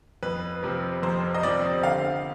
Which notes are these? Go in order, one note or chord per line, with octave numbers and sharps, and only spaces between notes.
F2 B4
C3 F3 C4
F2 C5
D#5
C3 F3 C4 D5
D3 F5